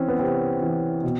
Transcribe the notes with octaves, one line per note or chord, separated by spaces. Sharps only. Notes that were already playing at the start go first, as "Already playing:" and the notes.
Already playing: E3 C4 C#4
B3
C3 C4
E3
B2